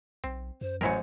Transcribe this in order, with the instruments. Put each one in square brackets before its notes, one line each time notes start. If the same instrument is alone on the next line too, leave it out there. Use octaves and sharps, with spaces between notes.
[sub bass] B1 [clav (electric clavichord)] C4
[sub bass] F#2 [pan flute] C5
[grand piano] A1 G#5 C#7 [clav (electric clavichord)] F#3 E4 A#4 [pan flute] C5